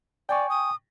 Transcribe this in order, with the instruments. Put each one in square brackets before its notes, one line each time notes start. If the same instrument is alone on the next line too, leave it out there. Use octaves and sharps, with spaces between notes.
[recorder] D5 [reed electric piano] G5 G#5 C#6
[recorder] D#6